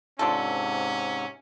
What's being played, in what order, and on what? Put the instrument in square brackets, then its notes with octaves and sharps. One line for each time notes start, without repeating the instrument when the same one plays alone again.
[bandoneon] G#2 C3 [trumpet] C#4 [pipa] D4 F4 A4